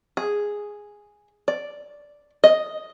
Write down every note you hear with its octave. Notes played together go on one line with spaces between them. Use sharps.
G#4
D5
D#5